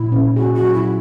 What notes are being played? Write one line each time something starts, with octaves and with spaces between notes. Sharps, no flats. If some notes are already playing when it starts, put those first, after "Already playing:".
Already playing: A#2 E4
C#4
F#4 G#4
F#4
F#3
E4